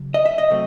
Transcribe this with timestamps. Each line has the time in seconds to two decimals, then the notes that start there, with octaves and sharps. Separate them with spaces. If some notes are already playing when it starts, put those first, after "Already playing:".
Already playing: C#3 F#3
0.14 D#5
0.26 E5
0.38 D#5
0.50 C3 F#3 A3 C4